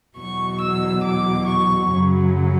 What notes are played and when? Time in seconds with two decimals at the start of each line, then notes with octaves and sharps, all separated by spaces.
0.16 E2 B2 F#3 C#6
0.60 E6
1.03 D6
1.47 C#6
1.91 F#2 C#3 F#3